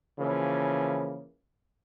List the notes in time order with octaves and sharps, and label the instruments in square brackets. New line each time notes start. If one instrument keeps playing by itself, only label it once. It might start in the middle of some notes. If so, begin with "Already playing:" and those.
[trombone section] C#3 E3 F3 A#3